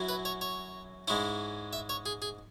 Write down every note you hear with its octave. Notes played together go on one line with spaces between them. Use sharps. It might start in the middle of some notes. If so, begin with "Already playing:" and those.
Already playing: F#2 F#3 C#4 E4
B4
C#5
C#5
G#2 G#3 C#4 E4
E5
C#5
G#4
G#4